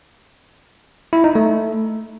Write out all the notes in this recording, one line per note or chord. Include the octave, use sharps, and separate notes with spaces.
E4
D#4
A3